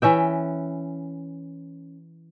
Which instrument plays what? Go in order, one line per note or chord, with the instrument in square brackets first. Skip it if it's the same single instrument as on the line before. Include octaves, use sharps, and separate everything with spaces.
[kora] E3 C#4 E5 G5